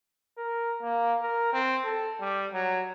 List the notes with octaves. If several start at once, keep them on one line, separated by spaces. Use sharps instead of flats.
A#4
A#3
A#4
C4
A4
G3
F#3